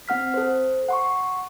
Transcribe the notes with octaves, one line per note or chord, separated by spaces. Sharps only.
C4 F#5 F6 B6
A4 C5
F#5 C6 C#6